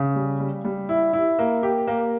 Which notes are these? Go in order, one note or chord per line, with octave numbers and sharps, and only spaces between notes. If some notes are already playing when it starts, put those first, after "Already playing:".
Already playing: C#3
G3
G3
G3
E4
E4
A#3
G4
A#3